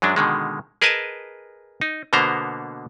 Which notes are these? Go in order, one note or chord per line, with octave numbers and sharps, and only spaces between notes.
F#2 F#3 G#3 D4
B2 D3 D#3 G#3
G#4 A#4 B4 D#5 G#5 A5
D#4
B2 D3 A#3 B3 C5 A#5